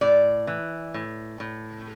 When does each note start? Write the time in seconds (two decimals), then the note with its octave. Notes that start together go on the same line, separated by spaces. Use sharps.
0.01 A2 D5
0.47 E3
0.94 A2
1.40 A2